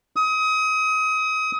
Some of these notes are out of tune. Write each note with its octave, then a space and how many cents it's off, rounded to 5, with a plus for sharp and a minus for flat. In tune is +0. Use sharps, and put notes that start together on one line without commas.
D#6 +30